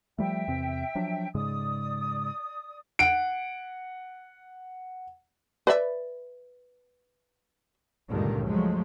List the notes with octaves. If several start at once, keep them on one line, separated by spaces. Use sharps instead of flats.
F3 G3 A3 E5 G5
E2 C3 C4
F3 F#3 D4
G#2 C#3 G#3 D5 D#6
F#5 D7
B4 D5 E5
C#2 G2 A#2 D3 D#3
F3 F#3 G#3 A3